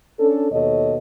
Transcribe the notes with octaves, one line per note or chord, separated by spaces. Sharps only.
C#4 D4 A4
D#2 B2 A4 C#5 D#5